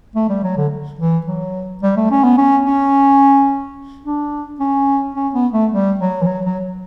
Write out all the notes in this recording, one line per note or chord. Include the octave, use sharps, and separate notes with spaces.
A3
G3
F#3
D3
E3
F#3
G3
A3
C#4
B3
C#4
C#4
D4
C#4
C#4
B3
A3
G3
F#3
E3
F#3
F#3